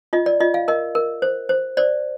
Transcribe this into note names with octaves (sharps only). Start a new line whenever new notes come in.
F4 D#5
D5
F4 D#5
F5
A#4 D#5
A#4
C5
C5
C5 D5